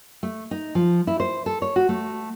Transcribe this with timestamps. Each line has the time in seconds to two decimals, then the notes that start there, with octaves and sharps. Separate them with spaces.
0.23 A3
0.51 D#4
0.75 F3
1.07 E4
1.20 C5
1.46 A4
1.62 C#5
1.76 F#4
1.89 A3